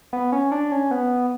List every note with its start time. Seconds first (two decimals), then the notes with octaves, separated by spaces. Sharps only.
0.13 B3
0.32 C#4
0.52 D4
0.72 C#4
0.91 B3